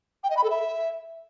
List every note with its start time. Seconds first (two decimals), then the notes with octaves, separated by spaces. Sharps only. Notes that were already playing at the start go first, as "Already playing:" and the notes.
0.24 G5
0.30 D#5
0.37 B5
0.44 A4
0.50 E5